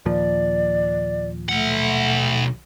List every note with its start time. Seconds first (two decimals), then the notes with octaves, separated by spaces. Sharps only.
0.06 D#2 A#2 F3 D5
1.49 B1 A3 F#5